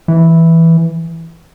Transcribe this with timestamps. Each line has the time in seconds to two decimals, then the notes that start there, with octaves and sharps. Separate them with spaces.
0.08 E3